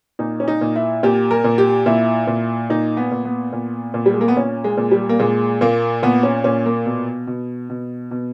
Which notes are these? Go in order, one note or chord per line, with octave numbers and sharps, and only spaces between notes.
A#2 D#4
C#4
D#4
A#2
E4
A#2 G4
A#4
A#2
G4
A#2 E4
A#2
A#2 D#4
B3
A#2
B3
A#2
A#2
G3
G#3
A#3
B3
A#2 C#4
G#3
A#2
G3
A#3
A#2 G#3
A#2 A#3
A#2 B3
C#4
A#2 C#4
A#3
B2
B2
B2
B2